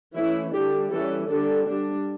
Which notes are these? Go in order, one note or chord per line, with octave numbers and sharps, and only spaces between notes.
E3 A3 C#4 E4
D3 G3 D4 G4
E3 G3 C#4 A4
D3 G3 D4 A4
G3 D4